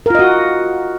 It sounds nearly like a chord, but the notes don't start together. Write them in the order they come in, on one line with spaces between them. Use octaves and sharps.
A#4 F4 D#5 F#4